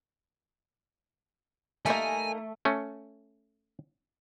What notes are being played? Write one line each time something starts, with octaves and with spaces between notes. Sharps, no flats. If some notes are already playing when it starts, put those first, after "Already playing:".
G3 A3 A#3 D#4 A#4 E5 G#5
A3 C#4